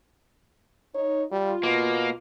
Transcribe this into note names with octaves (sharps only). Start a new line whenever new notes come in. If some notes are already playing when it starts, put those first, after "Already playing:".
D#4 C#5
G3 F4
B2 A#3